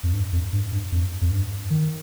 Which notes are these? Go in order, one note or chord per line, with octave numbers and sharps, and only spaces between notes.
F2
G2
F2
G2
G2
F2
F2
G2
D#3